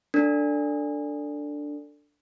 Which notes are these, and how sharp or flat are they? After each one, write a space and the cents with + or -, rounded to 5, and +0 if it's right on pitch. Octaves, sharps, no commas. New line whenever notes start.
D4 +0 A4 +25